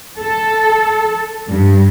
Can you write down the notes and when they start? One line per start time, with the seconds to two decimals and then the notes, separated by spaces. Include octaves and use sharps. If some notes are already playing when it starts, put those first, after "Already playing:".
0.21 A4
1.48 G2